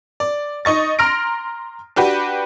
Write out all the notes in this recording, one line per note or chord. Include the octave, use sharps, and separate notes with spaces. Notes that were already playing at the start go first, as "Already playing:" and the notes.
D5
D#4 D#5 C#6 A6
A#5 C6 F6 A#6 D7
D4 F#4 G4 B4